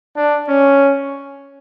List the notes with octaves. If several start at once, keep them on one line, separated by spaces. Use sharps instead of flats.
D4
C#4